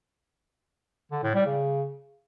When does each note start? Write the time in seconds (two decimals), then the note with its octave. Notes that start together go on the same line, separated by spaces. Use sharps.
1.11 D3
1.23 A2
1.35 G3
1.46 C#3